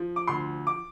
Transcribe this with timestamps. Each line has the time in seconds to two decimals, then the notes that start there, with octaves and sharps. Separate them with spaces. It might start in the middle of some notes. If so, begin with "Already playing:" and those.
Already playing: F3
0.16 D6
0.28 D2 C6
0.67 D6